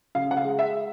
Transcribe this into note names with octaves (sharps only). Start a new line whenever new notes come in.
C#3 F5
F#5
F5
G#3
E5